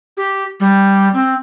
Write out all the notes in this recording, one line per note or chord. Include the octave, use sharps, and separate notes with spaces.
G4
G3
C4